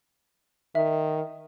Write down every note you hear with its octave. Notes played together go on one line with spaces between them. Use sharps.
D#3 E5